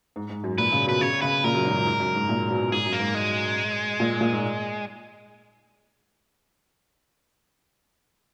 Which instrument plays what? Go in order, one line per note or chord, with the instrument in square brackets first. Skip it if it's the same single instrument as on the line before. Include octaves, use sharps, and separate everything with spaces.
[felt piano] G#2
G#2
F#2
[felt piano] A#2 [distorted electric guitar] B4
[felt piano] C#3
[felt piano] B2 [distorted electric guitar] B4
[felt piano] C#3 [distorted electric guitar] C#5
[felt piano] C#3 [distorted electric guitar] B4
[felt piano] A#2 [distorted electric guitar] A#4
[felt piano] F#2
G#2
F#2
G#2
G#2
F#2
G#2
A#2
B2
[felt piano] G#2 [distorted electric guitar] G#4
[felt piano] F#2
[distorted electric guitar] A#3
[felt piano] G#2
[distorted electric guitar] G#3
[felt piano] A#2
A#2
G#2